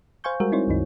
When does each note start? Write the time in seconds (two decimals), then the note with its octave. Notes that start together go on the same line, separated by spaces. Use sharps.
0.24 C5 F5 G#5 C#6 G6
0.40 G3 G#3 F#4 A#4
0.52 C4 D#4 E4 C5 C#5
0.68 C2 F#2 D#3 D#4